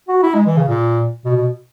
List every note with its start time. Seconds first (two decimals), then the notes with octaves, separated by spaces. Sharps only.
0.08 F#4
0.23 E4
0.34 G#3
0.46 E3
0.57 C#3
0.68 A#2
1.25 B2
1.37 B2